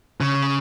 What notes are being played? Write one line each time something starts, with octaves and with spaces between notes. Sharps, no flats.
C#3